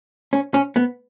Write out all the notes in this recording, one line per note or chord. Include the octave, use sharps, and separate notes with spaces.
C#4
C#4
B3